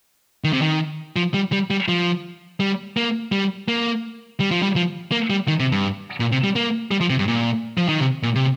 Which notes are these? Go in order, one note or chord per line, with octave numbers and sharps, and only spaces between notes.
D#3
C3
D#3
F3
G3
G3
G3
F3
G3
A#3
G3
A#3
G3
F3
G3
F3
A#3
G3
D#3
C3
G2
A#2
C3
G3
A#3
G3
F3
C3
G2
A#2
F3
D#3
C3
A#2
C3